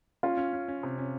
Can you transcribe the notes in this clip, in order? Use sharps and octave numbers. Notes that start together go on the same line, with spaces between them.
C#4 F4
C#4
C#4
C#4
C3
C#4